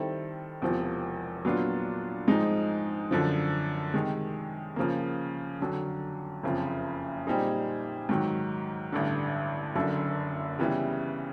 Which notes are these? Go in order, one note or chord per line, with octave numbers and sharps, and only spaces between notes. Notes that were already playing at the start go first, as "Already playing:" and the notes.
Already playing: D#3 G3 C4 E4 A4
E1 E2 C3 F3
A#2 F#3 B3 D4 F4
G#2 F3 G#3 C4 D#4
F#2 D3 F3
C3 D#3 G#3
C#3 F3 A#3
F2 D3 F#3
F#1 F2 C#3 F3
A#2 G3 C4 D#4 G#4
G#2 D#3 F#3
A1 G2 D3
F#1 F#2 D3
C#3 E3 G3 B3 E4